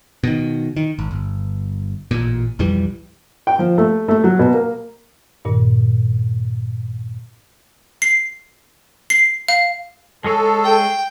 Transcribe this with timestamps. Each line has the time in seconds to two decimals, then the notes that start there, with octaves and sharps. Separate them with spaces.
0.24 B2 D#3
0.76 D#3
0.99 G#1
1.11 G1
2.11 A1 A#2
2.59 B1 F2 E3 G3
3.47 G5
3.59 F3
3.78 A3
4.08 A3
4.24 F#3
4.39 B2
4.54 A#3
5.45 G2 A#2 D#3
8.02 C7
9.10 C7
9.48 F5
10.24 G#3 G#4 A4 C#5
10.64 G5